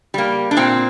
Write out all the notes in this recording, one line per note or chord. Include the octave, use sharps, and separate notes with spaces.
G3 A#3
D4
A#2 C4